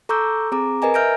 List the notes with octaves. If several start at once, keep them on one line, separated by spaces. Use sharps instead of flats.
A4 A#5 C#6 D6 E6 G6
C4 G#4 A#5 D6
A#4 B4 D#5 G#5 A#5
E5 F6 G6 A#6 D7